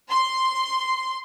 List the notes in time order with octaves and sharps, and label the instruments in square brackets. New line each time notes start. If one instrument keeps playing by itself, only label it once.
[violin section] C6